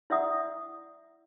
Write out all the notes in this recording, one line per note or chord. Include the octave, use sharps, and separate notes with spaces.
E4 D5 E5 F#5 D#6